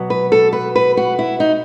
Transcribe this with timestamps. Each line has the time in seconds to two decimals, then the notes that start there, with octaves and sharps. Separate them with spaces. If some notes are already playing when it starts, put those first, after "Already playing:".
Already playing: B2 F#3 B3
0.10 B4
0.32 A4
0.53 B4
0.76 B4
0.97 F#4
1.19 E4
1.40 D#4